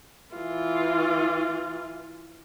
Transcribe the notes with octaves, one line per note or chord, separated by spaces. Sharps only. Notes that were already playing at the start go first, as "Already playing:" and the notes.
E3 F4